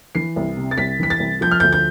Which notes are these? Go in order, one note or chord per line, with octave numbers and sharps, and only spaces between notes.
E3 C7
C2
C3
A6
C2 B6
E3 B6
A6
C2
F3 G6
F6
D2 G6
G6